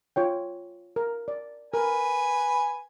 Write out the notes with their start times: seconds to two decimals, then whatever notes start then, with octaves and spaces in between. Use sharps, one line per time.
0.16 F4 C#5 G5
0.96 A#4
1.28 D5
1.74 A#4 B4 G#5